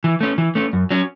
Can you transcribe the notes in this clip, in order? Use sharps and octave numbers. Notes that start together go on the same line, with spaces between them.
E3
A3 C#4
E3
A3 C#4
F#2
F#3 C#4